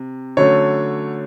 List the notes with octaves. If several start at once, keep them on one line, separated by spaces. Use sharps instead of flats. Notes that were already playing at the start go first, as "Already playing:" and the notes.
Already playing: C3
D3 F#3 A3 C#4 C#5